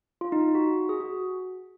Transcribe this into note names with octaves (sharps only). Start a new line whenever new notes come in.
F4
D#4
F#4
G#4
F#4